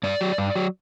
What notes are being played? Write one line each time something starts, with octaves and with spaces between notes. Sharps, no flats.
G2 D5
F#3
G2
F#3